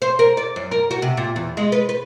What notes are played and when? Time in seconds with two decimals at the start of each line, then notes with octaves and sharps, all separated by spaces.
0.02 C5
0.19 A#4
0.37 D5
0.56 F#2
0.71 A#4
0.91 F#4
1.02 C3
1.17 A#2
1.36 E2
1.57 G#3
1.72 B4
1.89 B4